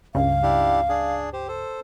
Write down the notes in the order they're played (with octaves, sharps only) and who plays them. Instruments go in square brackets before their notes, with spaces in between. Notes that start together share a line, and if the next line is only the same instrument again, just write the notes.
[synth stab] C#2 G2 C#3 [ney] F5
[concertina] D4 E4 G4
D4 G#4
G4 C5
A4 C5